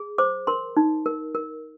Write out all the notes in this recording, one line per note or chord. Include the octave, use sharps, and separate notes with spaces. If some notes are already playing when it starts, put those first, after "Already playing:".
Already playing: G#4
C5 D6
A#4 C6
D#4
A#4
A#4